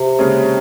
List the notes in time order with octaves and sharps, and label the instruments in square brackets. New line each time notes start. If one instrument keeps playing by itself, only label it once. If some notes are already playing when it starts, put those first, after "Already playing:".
Already playing: [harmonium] C3
[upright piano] D#2 C#3 G#3 C#4 G#4